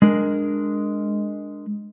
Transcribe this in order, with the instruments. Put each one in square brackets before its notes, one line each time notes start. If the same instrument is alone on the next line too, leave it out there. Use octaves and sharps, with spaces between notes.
[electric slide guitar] G#3 D4 A#4